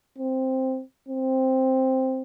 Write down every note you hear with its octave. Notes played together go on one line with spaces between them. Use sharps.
C4
C4